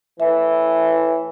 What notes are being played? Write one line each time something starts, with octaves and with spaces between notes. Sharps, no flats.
A2 E3 E5